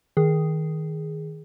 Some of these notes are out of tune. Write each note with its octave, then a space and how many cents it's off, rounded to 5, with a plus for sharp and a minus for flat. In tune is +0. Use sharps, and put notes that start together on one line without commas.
D#3 +15 G#4 +0